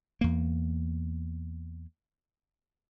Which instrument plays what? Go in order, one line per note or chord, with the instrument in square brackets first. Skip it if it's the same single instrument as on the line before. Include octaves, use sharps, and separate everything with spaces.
[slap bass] E2 A#3